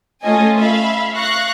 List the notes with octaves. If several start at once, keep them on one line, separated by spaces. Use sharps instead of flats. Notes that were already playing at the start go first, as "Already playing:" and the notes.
A3 C#4 F4 A4 D#5 G#5
E5 F5 B5
F5 C#6 F#6 A#6